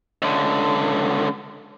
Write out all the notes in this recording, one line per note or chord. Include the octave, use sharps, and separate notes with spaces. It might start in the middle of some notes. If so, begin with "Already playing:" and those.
C#2 D3